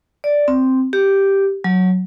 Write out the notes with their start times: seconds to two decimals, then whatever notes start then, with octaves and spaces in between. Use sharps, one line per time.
0.24 D5
0.48 C4
0.93 G4
1.64 F#3